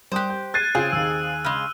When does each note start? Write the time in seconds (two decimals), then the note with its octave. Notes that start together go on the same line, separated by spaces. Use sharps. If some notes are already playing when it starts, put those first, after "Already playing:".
0.12 G3 G4 C5 D#6 F#6
0.30 G6
0.54 F#6 G#6 A6 C7 D#7
0.75 C#3 C4 F4 G#4 F5
0.93 D#2 D#4 E6
1.45 C#3 G#3 F6